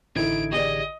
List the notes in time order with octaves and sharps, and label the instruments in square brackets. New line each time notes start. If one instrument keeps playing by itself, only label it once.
[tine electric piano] A1 D3 G#6 [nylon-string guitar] D#4 E4 A4 [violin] D7
[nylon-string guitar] G4 G#4 D5 [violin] D#5